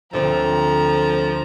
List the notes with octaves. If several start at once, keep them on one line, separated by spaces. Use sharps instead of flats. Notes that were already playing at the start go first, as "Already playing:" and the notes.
D2 D3 F3 C4 A#5